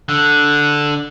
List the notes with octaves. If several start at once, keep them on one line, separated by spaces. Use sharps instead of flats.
D3